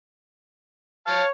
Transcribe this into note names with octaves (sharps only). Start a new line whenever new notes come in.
C#5 F5 A5